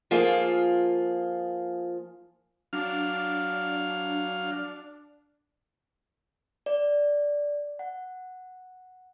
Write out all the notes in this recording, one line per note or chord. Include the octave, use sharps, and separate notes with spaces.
F3 A#3 F4 G#4
F#3 D4 F5 F6
D5
F#5